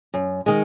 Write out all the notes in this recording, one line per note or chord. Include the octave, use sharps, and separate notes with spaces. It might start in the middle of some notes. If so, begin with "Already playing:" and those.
F#2
D#3 G#3